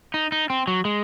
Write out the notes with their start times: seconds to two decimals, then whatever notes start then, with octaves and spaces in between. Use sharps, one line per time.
0.14 D#4
0.32 D#4
0.50 C4
0.67 F#3
0.85 G#3